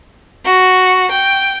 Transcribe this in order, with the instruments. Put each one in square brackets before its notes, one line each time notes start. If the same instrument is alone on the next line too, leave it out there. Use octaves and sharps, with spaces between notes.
[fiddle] F#4
G5